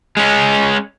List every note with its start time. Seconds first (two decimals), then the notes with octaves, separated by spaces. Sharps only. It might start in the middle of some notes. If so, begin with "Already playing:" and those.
0.17 G#3 C#4